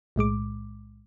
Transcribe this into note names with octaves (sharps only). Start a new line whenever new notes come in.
B1 A2 G#3 D6